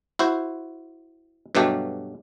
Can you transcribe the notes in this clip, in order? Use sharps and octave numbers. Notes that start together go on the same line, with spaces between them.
E4 F#4 C5
G2 B2 F#3 A3 G4